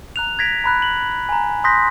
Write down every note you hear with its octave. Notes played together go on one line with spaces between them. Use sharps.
A#5 F#6 F7
G#6 A#6 B6 D7 F7
A#5 B5 F#6
F#7
G#5 A#5
C6 D#6 F#6 G6 A#6 B6